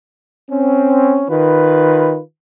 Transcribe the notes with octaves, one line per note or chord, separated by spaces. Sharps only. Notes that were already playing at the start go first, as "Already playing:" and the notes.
C4 C#4
D#3 F4 B4